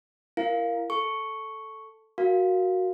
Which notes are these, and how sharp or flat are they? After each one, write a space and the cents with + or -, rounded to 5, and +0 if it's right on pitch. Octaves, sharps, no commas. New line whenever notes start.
E4 +30 A#4 +0 F5 +0
A4 +0 C#6 +0
F#4 +0 A#4 +0 F5 +0